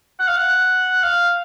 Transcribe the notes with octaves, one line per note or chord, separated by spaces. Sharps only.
F#5
F5
F#5
F5